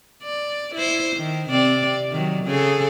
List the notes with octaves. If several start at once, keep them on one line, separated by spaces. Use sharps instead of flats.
D5
E4 C5
D#3
C3 C4 D5
D#3 F#3
C#3 G#4 A4